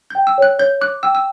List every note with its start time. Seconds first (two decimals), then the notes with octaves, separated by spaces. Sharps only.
0.10 G5 G6
0.27 E6
0.38 C#5 F#6
0.59 C#5 G6
0.81 D6 F#6
1.03 G5 E6
1.15 E6